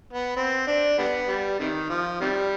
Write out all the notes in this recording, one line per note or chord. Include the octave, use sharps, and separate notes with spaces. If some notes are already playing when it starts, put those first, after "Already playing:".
B3
C4
D4
D3 G3 B3
G3
C3 D#3
F3
C3 D#3 G3